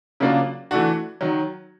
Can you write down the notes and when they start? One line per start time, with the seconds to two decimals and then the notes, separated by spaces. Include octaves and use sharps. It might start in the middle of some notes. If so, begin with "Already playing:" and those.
0.20 C#3 F#3 A#3 D4 F4
0.71 E3 A3 D4 F#4
1.21 D#3 F#3